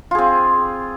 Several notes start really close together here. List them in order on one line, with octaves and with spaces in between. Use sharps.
F4 G#4 C4